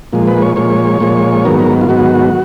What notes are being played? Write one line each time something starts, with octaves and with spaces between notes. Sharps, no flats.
A#2 F3 G#3
B4
C#5
A#2 F3 G#3 C#5
A#2 F3 G#3
G#2 D#3 F#3 B3 A#4
A#4
F4
G#2 D#3 F#3 B3 F#4